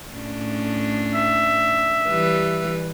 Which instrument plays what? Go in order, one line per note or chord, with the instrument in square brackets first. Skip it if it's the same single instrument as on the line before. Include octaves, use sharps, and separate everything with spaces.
[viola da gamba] A2 C#4 D4
[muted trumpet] E5
[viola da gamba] E3 G3 B4